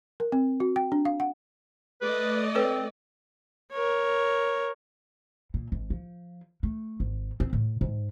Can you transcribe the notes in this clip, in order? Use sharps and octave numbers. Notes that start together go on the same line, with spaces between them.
A#4
C4
F#4
G5
D4
F5
F#5
A3 B4 D5 D#5
C4 A4 B4 C#5
A#4 C#5
A#2
G#1
F3
A3
G#1
C4
A2
G#2